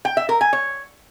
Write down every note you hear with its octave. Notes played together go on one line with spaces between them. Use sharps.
G5
E5
A#4
G#5
C#5